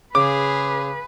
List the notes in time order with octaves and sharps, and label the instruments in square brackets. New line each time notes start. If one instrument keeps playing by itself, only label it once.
[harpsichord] C#3 [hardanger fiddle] G#4 F5 [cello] B4 [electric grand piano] D6